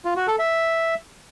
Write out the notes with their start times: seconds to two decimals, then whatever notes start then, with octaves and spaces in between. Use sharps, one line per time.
0.05 F4
0.16 F#4
0.28 A4
0.39 E5